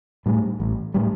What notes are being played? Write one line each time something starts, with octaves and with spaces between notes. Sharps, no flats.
A2 G3
A1
A2 G3